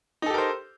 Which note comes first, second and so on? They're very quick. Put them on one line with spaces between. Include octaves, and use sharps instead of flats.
D#4 A4 G4 A#4 C5